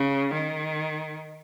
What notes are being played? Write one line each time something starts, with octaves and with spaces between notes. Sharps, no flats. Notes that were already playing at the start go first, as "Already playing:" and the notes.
Already playing: C#3
D#3